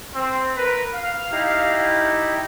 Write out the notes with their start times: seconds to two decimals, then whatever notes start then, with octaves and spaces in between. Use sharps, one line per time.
0.14 C4
0.56 A#4 B4
0.93 F5
1.31 D#4 E4 G4